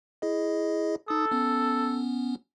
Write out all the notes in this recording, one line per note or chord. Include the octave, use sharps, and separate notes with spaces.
E4 G#4 D#5
D#4 A4 D#6
B3 C#4